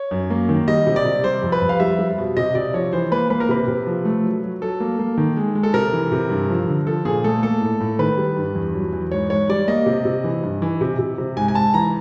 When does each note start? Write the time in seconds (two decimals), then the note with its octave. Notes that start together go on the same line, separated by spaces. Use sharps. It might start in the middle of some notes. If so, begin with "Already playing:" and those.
Already playing: C#5
0.11 F#2
0.30 A#3
0.49 D#3
0.68 G3 D#5
0.87 C3
0.96 D5
1.05 C3
1.24 G3 C5
1.43 F2
1.52 B4
1.61 F2
1.69 F5
1.80 G3 E5
1.99 G3
2.18 B2
2.37 C3 D#5
2.55 C3 D5
2.74 F3 C#5
2.93 E3 C5
3.11 A#3 B4
3.30 A#3 B4
3.40 A#4
3.49 C3 B4
3.68 C3
3.87 F3
4.05 A3
4.24 F#3
4.43 F#3
4.62 F#3 A4
4.80 A#3
4.99 A#3
5.18 D#3
5.37 G#3
5.55 G#3
5.63 A4
5.74 C3 A#4
5.93 E3
6.12 C3
6.30 G2
6.49 F3
6.68 D3
6.87 F3 A4
7.05 A#2 G#4
7.24 A3 A4
7.43 A#3 A4
7.61 A2
7.80 A2
7.99 D#3 B4
8.18 G3
8.36 G2
8.55 E2
8.74 F#3
8.93 E2
9.12 G#2 C#5
9.30 G#2 C#5
9.49 G3 D5
9.68 A#3 D#5
9.86 C3
10.05 C3
10.24 E3
10.43 G2
10.62 E3
10.81 C3
10.99 C3
11.18 C3
11.37 G#2 G#5
11.48 G#5
11.55 G#2 A5
11.74 E3 A#5